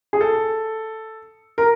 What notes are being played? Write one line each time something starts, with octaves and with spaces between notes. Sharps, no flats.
G#4
A4
A#4